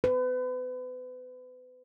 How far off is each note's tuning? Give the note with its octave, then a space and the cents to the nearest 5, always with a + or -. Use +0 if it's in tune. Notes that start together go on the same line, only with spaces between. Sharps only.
B4 +35